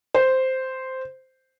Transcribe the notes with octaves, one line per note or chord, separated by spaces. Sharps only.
C5